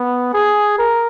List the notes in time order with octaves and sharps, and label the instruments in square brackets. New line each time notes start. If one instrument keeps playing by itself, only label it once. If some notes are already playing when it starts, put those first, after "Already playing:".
Already playing: [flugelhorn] B3
G#4
A#4